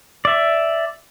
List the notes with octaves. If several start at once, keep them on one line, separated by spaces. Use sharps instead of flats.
D5 E5